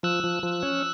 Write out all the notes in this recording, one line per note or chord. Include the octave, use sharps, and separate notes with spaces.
F3 E6 F#6
F3
F3
C#4